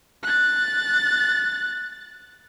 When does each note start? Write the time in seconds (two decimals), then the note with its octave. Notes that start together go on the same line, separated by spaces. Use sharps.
0.23 F#6 A6